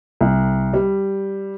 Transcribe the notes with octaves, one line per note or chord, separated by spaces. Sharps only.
C2
G3